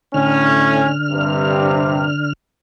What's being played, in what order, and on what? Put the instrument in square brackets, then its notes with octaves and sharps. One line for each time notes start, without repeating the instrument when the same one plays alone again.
[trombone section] A2 C#4 [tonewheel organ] D3 F6
[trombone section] G2 C3